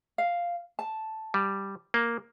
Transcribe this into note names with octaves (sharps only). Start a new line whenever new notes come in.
F5
A5
G3
A#3